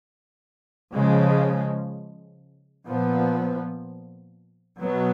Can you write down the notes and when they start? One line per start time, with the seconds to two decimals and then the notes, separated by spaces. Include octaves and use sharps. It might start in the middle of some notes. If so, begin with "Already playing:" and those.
0.96 C#3 F3 G#3
2.88 A#2 F3 B3
4.80 B2 F#3 B3